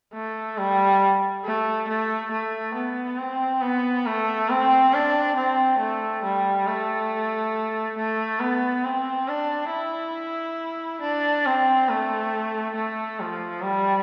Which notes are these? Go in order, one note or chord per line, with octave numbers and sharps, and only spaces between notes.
A3
G3
A3
A3
A3
B3
C4
B3
A3
C4
D4
C4
A3
G3
A3
A3
B3
C4
D4
E4
D4
C4
A3
A3
F3
G3